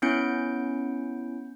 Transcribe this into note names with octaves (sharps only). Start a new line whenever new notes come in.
B3 C#4 E4 G6 C#7 D7